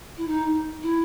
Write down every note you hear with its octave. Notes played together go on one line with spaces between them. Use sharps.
E4
D#4
E4